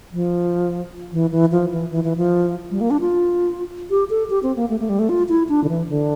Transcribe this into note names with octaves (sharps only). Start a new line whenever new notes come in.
F3
E3
E3
F3
E3
E3
E3
F3
G3
A#3
D4
F4
G4
A4
G4
C4
A#3
A3
A3
G3
A3
F4
E4
D4
D3
E3
D3